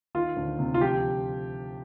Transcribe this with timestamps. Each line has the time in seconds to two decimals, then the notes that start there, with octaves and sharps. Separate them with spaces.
0.15 D#3 F4
0.36 D2
0.59 C3
0.74 F4
0.81 F3 G4